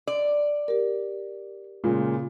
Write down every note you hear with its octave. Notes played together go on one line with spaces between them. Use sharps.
D5
G4 A#4
A#2 C#3 G#3